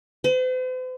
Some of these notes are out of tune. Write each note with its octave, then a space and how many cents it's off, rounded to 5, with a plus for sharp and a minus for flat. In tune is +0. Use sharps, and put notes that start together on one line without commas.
C5 -45